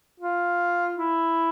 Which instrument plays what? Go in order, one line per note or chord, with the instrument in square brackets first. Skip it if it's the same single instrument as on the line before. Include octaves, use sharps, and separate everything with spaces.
[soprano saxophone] F4
E4